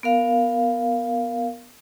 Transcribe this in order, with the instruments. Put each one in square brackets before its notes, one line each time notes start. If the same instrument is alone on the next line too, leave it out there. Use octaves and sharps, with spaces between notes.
[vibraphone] B3 A#4 F5